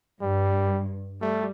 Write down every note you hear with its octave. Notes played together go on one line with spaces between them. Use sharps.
G2 G3
G3 A3